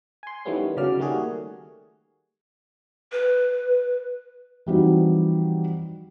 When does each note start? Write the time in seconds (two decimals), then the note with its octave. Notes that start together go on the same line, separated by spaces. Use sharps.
0.23 G#5 C6
0.45 D#3 E3 G3 A3 B3 C#4
0.77 C#3 F#3 D5 F6
0.98 D#3 G3 A3 A#3 F#4 G#4
3.12 B4
4.66 E3 F3 G3 C4 D#4 F#4